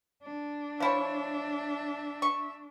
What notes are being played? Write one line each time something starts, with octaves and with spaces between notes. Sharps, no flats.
D4
F3 E4 C#5 E5
C#6